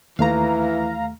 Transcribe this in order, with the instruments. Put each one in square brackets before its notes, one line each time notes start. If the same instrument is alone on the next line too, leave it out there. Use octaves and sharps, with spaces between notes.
[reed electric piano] D#2 A3 [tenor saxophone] E3 [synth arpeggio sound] F5 A#5